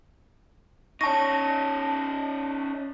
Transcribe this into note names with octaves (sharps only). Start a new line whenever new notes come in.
C#4 D#4 C#5 A5 C#6 A#6